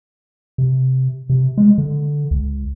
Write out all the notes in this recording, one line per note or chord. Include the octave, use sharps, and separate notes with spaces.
C3
C3
G#3
D3
C#2